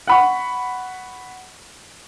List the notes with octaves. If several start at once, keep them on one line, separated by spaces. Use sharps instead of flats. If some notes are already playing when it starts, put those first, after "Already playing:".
F#5 B5 C#6